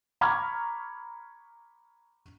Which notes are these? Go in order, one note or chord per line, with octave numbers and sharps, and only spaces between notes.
A#5 B5 C#6 D6 F6 G#6